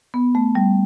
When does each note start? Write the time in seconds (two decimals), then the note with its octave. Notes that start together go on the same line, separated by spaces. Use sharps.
0.14 B3
0.35 A3
0.55 G3